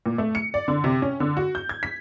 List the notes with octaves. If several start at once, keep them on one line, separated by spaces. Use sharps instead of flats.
A#2
A3
C#7
D5
D3
C3
C#4
D3
F#4
G6
G#6
B6